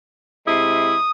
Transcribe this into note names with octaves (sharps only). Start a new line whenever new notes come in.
C3 G#3 E4 D#6